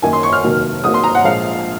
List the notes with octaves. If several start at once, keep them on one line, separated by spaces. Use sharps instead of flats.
F#2 D#3 A#3 G#5
C6
C#6
F6
F1 D#2 D#3 F#3 A#3
G#1 G#2 F#3 A#3 D#6
C6
A#5
F#5
A#1 A#2 F3 G#3 F5